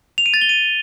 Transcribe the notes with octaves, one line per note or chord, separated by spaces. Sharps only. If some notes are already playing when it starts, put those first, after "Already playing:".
F7
D#7
A6
G7
D#7